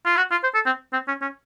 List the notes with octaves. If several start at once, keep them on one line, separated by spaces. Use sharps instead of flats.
F4
F#4
F4
C5
A4
C4
C4
C#4
C#4